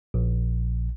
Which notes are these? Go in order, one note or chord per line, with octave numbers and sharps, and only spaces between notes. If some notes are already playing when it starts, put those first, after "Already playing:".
A#1